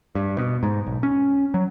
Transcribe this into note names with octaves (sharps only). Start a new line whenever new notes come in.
G2
B2
G#2
B1
C#4
F#3